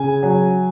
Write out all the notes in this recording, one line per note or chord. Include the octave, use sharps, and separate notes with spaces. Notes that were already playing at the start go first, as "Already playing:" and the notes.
Already playing: C#3 G#5
F#3